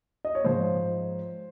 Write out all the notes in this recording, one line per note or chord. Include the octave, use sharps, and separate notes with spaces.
D#5
C#5
G#2 F3 G#3 C5